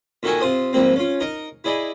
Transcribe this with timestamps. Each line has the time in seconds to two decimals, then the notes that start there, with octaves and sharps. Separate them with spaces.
0.23 A#2 D#3 F#4 A4 A#4 G#5
0.41 C3 F4 C5 D#6
0.73 G#2 F3 G3 A#3 C4
0.96 C#4 F4
1.20 D#4 A#4 D#5
1.64 E4 G#4 D5 D#5 B5